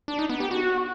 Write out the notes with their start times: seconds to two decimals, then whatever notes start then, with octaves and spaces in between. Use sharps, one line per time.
0.08 D4
0.19 D#4
0.29 B3
0.40 G4
0.51 F#4